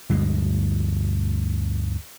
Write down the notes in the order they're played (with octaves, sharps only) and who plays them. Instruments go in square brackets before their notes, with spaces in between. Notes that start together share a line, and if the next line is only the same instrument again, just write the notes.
[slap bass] D2 G2 B2 G#3